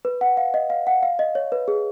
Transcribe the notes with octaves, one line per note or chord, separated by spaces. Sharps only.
B4
F#5
F5
D#5
F5
F#5
F5
D#5
C#5
B4
G#4